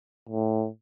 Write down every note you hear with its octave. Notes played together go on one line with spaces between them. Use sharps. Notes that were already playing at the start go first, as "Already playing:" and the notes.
A2